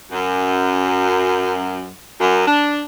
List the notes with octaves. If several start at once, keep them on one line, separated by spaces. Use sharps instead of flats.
F#2
F#2
D4